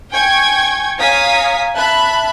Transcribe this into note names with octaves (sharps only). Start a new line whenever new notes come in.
G5 G#5 C#6 G#6
C#5 F5 G#5 A#5 D#6 B6
E5 A5 B5 F#6